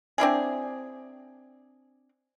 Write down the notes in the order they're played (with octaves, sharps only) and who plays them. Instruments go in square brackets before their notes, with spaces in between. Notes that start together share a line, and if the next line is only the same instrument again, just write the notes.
[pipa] C4 D4 E4 G#4